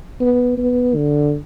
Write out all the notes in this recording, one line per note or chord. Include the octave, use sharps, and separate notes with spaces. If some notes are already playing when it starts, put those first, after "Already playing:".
B3
B3
D3